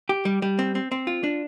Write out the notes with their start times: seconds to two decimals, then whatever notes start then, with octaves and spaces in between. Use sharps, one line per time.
0.09 G4
0.25 G3
0.42 G3
0.59 C4
0.75 C4
0.92 C4
1.07 F4
1.24 D4